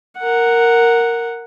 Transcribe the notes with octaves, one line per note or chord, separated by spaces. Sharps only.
A#4 F#5